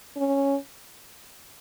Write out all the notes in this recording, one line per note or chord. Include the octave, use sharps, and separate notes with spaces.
C#4